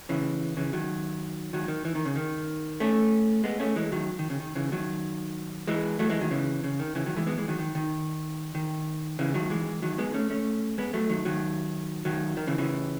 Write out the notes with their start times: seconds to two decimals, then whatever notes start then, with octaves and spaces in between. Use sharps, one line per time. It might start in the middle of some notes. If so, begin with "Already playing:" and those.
0.09 C#3 E3
0.57 C#3 E3
0.73 D#3 F#3
1.53 D#3 F#3
1.68 D#3
1.85 E3
1.95 D#3
2.05 C#3
2.16 D#3
2.80 A3 C#4
3.44 G#3 B3
3.60 A3 C#4
3.76 E3 G#3
3.92 D#3 F#3
4.19 D#3
4.30 C#3
4.40 D#3
4.55 C#3 E3
4.72 D#3 F#3
5.67 E3 G#3
5.99 F#3 A3
6.10 E3 G#3
6.21 D#3 F#3
6.31 C#3 E3
6.64 C#3
6.79 D#3
6.95 C#3 E3
7.06 D#3 F#3
7.16 E3 G#3
7.27 G#3 B3
7.38 E3 G#3
7.48 D#3 F#3
7.59 D#3
7.75 D#3
8.55 D#3
9.19 C#3 E3
9.34 D#3 F#3
9.50 E3 G#3
9.82 D#3 F#3
9.98 G#3 B3
10.14 A3 C#4
10.30 A3 C#4
10.78 G#3 B3
10.94 F#3 A3
11.10 D#3 F#3
11.25 D#3 F#3
12.05 D#3 F#3
12.37 D#3
12.47 C#3 E3
12.58 C#3 E3